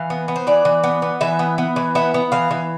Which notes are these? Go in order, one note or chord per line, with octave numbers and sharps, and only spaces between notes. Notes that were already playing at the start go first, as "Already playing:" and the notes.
Already playing: E3 F5
B3
B3
C5
E3 D5
E3
B3
B3
E3 E5
B3
B3
E3
B3 E5
B3
E3 F5
E3